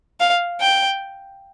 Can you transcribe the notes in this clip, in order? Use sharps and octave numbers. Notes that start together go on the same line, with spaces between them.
F5
G5